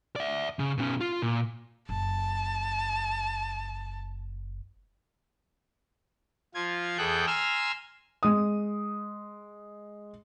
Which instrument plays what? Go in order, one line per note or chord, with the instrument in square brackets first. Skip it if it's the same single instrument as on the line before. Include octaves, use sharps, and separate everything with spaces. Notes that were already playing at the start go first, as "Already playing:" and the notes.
[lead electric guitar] D5 E5
C#3
B2 C#4
F4
A#2
[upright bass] F#1 [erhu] A5
[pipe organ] F3 F4 G#6
E2 G#4 A4 G5 F#6 G6
G#5 A#5 C6 E6 F6
[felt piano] G#3 D#6